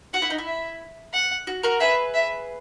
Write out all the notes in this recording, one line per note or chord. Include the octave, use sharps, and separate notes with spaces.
F#4 F#5
E4
D#4
E4
E5
F#5
F#4
F#4 A#4
G#4 B4 E5
E5